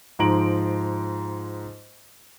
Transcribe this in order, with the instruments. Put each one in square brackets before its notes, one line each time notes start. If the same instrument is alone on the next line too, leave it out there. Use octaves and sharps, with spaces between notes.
[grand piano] G#2 F3 A#5 D7 F#7